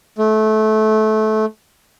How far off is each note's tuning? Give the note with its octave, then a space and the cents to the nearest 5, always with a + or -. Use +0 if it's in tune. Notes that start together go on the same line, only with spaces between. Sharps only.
A3 -20